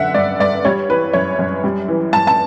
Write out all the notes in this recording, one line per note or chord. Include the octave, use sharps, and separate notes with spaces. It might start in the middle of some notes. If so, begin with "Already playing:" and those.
Already playing: F#2 D3 E5 F#5
G2 D5
G2 D5
G3 C#5
E3 B4
F#2 C#5
F#2
G3
E3
G2 A5
A5